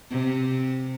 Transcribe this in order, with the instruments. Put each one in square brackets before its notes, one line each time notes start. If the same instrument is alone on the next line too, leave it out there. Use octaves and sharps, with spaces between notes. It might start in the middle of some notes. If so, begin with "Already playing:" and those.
[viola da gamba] C3